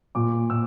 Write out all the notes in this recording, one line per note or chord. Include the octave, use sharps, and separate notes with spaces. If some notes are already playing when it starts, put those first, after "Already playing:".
A#2 D6
A#2 E6